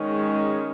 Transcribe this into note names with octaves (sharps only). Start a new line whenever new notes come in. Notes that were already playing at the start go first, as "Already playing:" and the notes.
Already playing: D#3 G#3 C#4